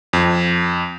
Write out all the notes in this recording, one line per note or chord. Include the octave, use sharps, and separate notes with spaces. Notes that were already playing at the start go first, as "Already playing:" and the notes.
F2